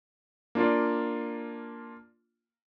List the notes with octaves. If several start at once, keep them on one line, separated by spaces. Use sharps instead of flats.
A#3 D4 F4 D5